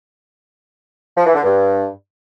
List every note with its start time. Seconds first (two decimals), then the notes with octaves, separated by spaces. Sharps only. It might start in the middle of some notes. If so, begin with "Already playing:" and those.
1.17 F3
1.26 E3
1.34 D3
1.43 G2